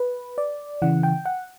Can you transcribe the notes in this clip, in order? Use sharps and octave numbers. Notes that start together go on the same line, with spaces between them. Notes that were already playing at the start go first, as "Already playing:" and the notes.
Already playing: B4
D5
C#3 E3 F#5
G5
F#5